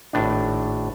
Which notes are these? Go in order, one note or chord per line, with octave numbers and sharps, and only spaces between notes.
G#1 A2 D4